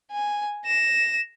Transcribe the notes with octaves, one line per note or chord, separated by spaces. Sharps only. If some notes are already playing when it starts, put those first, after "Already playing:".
G#5
A#6 E7